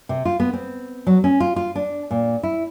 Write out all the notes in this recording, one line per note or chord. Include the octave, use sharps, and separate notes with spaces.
C3
F4
B3
C4
F#3
C#4
F4
F4
D4
A#2
E4